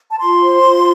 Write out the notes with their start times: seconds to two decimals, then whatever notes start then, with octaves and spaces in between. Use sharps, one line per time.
0.10 A5
0.20 F4 C6
0.42 C5
0.62 F4